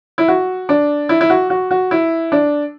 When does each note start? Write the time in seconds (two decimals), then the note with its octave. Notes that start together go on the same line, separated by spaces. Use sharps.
0.18 E4
0.28 F#4
0.69 D4
1.09 E4
1.21 E4
1.30 F#4
1.50 F#4
1.71 F#4
1.91 E4
2.32 D4